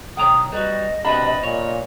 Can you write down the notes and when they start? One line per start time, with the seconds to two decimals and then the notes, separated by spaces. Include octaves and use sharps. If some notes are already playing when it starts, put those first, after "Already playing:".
0.17 B1 D#3 C#5 G5 A#5 D#6
0.52 G3 F#4 B4 D#5
1.05 C3 D4 F#4 B4 B5
1.43 A#2 C#5